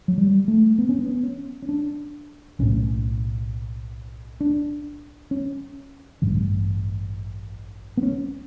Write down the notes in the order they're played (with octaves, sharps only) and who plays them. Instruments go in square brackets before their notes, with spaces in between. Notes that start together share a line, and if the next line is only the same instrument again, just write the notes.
[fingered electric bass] F#3
G3
A3
B3
C#4
B3
C#4
C#4
D4
B1 A2 C#4
D4
C#4
A1 G2 D3
B3
C#4